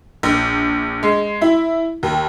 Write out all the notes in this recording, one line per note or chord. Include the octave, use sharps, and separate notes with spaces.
A#1
G#3
E4
D#2